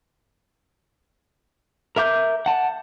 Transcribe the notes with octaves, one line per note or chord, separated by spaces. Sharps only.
A#4 E5 D6 G6
F#5 A5